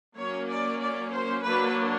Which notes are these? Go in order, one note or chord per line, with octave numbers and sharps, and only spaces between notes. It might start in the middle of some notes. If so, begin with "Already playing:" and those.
F#3 A#3 C#4 C#5
D5
D5
C5
F#3 A#3 D4 B4